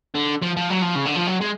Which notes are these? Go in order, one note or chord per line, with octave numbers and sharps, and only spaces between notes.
D3
F3
F3
F#3
F3
C#3
D3
F3
F#3
G#3